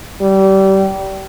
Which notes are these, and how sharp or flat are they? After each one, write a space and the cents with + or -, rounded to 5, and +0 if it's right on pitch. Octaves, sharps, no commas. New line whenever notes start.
G3 -25